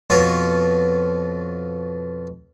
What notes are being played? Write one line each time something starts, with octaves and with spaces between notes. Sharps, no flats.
F2 B2 F4 C#5